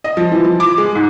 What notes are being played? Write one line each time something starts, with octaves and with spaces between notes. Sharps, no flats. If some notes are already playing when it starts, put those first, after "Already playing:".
D#5
F3
E3
F3
D6
G#3
G#2